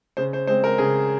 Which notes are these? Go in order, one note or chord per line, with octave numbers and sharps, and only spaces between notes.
C#3 C5
C5
G#3 C4 C5
A#4
C#3 G#4